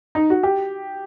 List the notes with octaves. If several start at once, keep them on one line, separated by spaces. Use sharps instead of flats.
D#4
F#4
G4